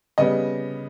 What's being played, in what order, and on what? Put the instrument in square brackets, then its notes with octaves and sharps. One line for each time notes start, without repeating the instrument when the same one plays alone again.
[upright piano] C#3 G3 B3 D#5